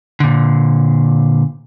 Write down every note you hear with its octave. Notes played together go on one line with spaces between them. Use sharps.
A#2 D3